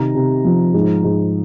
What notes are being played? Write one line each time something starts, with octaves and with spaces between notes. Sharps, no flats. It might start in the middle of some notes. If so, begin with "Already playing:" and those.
Already playing: C3 D#3 A#5
C3
F3
G#2
G#2